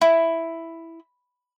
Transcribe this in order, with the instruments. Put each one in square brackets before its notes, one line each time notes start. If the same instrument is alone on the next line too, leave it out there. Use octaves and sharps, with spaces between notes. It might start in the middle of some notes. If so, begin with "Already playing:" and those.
[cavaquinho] E4